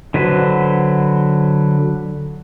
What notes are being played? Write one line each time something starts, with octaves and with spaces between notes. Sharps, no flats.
D3 F#3 B4 C5